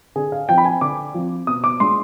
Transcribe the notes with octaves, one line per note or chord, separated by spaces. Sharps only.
D3 G#4
F5
F3 C4 G5
B5
G#5
D3 D6
F3 C4
B2 D#6
D6
G#3 D4 F4 C6